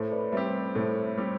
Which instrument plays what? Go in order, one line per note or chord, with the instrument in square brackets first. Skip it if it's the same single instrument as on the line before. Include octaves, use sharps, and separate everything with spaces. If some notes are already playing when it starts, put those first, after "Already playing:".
Already playing: [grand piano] A2 [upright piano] A4 C5
[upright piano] B4 D5
[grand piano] G3 C4 G4 [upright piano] C5 E5
[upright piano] C5 E5
[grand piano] A2 [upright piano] A4 C5
[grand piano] G3 C4 G4